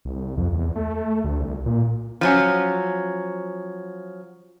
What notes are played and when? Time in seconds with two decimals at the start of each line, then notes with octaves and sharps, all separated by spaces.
0.05 C2
0.37 F2
0.53 E2
0.75 A3
1.24 D2
1.40 C2
1.66 A#2
2.21 F3 F#3 C#4